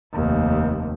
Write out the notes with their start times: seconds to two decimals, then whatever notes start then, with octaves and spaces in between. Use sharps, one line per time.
0.13 F1 D#2